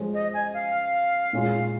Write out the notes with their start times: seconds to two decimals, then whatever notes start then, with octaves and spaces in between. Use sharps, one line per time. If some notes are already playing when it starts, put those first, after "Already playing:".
Already playing: F3 G#3 C#4
0.14 D#5
0.34 G#5
0.53 F5
1.33 A#2 G#3 C#4 F4